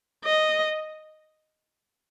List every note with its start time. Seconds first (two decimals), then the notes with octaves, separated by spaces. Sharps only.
0.25 D#5